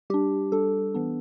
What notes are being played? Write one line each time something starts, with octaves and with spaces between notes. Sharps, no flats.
G3 D4 G4
G3 D4 A4
E3 B3 D4